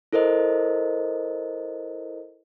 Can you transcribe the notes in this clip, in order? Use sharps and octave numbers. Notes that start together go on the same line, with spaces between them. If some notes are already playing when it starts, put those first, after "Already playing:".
E4 A4 A#4 C5 D#5